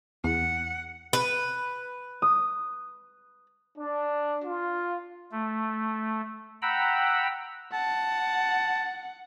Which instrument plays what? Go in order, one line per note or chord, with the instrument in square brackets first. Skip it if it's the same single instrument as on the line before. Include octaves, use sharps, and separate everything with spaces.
[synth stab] E2 [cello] F#5
[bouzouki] B4
[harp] D#6
[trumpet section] D4
F4
[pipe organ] A3
F#5 G5 A#5 B5 E6
[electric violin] F#5 [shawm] A5